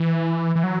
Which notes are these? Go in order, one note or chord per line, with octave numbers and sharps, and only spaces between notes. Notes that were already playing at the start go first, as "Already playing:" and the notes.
Already playing: E3
E3
F#3